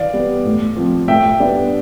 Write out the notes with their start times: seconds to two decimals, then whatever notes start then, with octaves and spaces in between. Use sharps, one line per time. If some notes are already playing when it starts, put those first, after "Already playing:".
Already playing: E3 D5 F5
0.13 G3 B3
0.45 A2
0.76 F3 C4
1.08 A2 E5 G5
1.39 G3 B3 D4